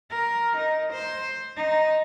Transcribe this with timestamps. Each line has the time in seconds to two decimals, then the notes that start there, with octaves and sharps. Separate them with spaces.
0.10 A#4
0.57 D#4
0.92 C5
1.56 D#4